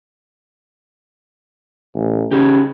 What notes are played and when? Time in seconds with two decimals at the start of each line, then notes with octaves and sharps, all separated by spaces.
1.95 A1
2.31 C#3 C#4 D#4 G4